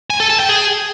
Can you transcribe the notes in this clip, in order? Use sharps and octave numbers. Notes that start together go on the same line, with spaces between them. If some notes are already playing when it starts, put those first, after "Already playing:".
G#5
A4
A5
G5
G#4